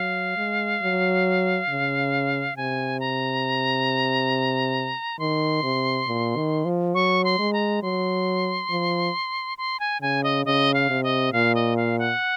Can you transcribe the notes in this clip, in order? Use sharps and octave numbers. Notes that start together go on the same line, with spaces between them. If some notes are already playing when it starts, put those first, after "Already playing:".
Already playing: F#3 F5
G#3
F#3
C#3
C3 G#5
A#5
D#3 C6
C3
A#2
D#3
F3
F#3 C#6
C6
G#3
A#5
F#3 C6
F3
C6
G#5
C#3 G#5
D#5
C#3 D#5
F5
C3
D#5
A#2 F5
D#5
F5
F#5